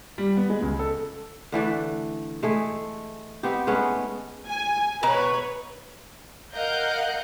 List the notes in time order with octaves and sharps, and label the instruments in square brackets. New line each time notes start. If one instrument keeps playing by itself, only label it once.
[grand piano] G3
B3
G#3
C#2
A4
[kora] D3 E3 A3 D5
G#3 A3 G#4
B3 C4 D#4 G4
G#3 A3 B3 C#4
[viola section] G#5
[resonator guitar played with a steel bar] B2 A#5 [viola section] B4 C#5
[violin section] A#4 D#5 F5 F#5 G6